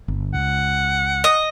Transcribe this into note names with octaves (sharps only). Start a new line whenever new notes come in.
G1
C#2 F#5
D#5